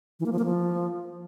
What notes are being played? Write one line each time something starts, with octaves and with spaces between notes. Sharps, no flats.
E3
A#3
F3
A#3
F3